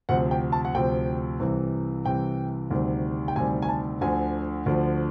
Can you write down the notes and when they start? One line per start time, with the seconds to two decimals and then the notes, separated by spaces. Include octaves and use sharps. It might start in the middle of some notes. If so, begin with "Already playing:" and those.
0.09 D2 C3 F3 F#5
0.31 G5
0.52 A5
0.65 F#5
0.75 D2 C3 F3 G5
1.40 C2 C3 E3
2.05 C2 C3 E3 G5
2.71 D2 C3 D#3 G3
3.28 G5
3.36 D2 C3 D#3 G3 G#5
3.62 G#5
3.69 A5
4.01 D2 D3 F3 G#5
4.66 D2 D3 F3